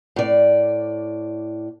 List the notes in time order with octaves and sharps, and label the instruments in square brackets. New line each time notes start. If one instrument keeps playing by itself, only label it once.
[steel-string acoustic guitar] A2 D5